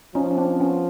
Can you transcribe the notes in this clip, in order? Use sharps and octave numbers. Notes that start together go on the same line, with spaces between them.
F3 C#4 D#4
C#4
C4 D4
B3 C#4